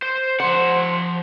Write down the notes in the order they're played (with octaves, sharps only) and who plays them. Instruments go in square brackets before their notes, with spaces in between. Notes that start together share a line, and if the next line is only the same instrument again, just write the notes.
[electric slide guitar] C5
[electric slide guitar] F3 F#5 [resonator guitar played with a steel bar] C5